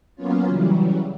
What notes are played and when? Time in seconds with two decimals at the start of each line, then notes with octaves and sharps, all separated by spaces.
0.16 F#3 A#3 B3 C#4 F4
0.47 C#3 E3 F#3 G3